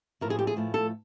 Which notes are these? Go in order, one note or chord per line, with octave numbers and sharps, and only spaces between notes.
A2 F3 A3 A#4
G#4
G4
G#4
A2 F3 A3
A4